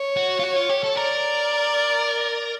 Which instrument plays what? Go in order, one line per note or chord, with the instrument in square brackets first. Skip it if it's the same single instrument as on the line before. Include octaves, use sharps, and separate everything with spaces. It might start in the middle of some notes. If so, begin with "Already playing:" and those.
Already playing: [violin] C#5
[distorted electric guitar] F#4
F4
F#4
F4
G4
A4
[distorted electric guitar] A#4 [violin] D5